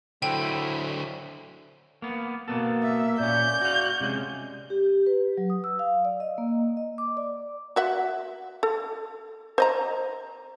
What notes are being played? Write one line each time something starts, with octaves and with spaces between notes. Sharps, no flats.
D3 F#3 A3 E4 A4 C5 E5 G5
A#3 B3
B2 A#3 B3 A4
E5
A#2 C#4 D5 G6
F#4 F5
C3 G#3 C#4
G4
B4
F#3
D#6
E6
F5
D5
D#5
A#3
D#5
D6
D5
F#4 E5 F#5
A4
C5 D#5 A#5